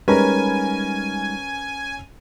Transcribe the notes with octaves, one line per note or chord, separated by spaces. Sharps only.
G3 G#3 C#4 D#4 A#4 B4 G#5